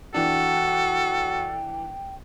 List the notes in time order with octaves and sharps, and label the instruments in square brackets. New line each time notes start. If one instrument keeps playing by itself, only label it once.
[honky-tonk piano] E3 D4 [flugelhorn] F#4 [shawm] A4 [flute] G5